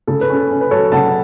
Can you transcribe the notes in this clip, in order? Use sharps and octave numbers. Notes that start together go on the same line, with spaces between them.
C#3 A4
B4
C#4
A4
C#4
B4
F#3 A4 C#5
C#3 F#5 A5